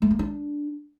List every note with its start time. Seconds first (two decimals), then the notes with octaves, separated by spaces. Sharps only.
0.02 A3
0.11 A#3
0.19 D4